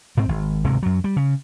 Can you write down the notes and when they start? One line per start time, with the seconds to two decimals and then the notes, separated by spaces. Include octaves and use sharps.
0.17 G#2 C4
0.29 G#1
0.64 G#1 D2 C3 G#3
0.83 F#2 F#3
1.04 G3
1.16 C#3